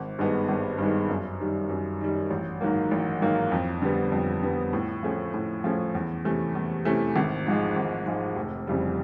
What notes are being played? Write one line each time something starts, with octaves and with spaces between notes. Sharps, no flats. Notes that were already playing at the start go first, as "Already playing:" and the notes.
Already playing: G#1
G2 D#3 G#3 B3
G#1
G2 D#3 G#3 B3
F#2
D#3 G3
F#2
D#3 G3
A1
G#2 D#3 F#3 A#3
A1
G#2 D#3 F#3 A#3
F2
D3 G3 B3
F2
D3 G3 B3
A2
F3 A3 C#4
A2
F3 A3 C#4
E2
C3 E3 A3 C#4
E2
C3 E3 A3 C#4
G#1
G#2 F3 G#3
G#1
G#2 F3 G#3
F1
F2 C#3 E3 G3